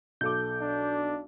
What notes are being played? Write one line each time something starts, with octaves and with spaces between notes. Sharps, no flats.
B1 A4 D6 G6
D4